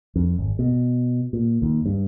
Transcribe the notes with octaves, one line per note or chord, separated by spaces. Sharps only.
F2
G#1
B2
A#2
D#2
G2